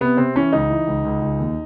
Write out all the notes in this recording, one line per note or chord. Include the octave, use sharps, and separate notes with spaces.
C3 B3
C3 C4
E3 C#4
C#2 D#4
E3
C#2
C#2
C#2
D#2